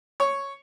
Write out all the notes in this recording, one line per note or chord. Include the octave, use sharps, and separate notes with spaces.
C#5